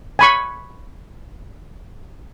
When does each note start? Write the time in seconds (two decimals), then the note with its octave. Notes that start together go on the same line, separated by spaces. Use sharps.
0.19 G#5 B5 C#6